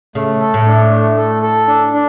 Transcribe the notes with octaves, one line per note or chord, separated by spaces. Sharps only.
C#3 A3
A4
A2
D4
A3
A4
A4
D4
D4